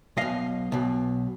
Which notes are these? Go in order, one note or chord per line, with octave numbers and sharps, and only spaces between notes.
B1 B2 D#5 F5
B1 B2